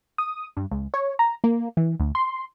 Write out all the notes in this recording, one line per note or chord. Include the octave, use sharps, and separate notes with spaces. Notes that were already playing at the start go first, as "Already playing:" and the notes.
D#6
G2
C#2
C#5
A#5
A#3
E3
D2
C6